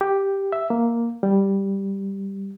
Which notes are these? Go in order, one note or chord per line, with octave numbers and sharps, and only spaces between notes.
G4
E5
A#3
G3